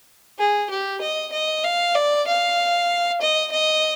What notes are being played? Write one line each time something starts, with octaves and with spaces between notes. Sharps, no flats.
G#4
G4
D#5
D#5
F5
D5
F5
D#5
D#5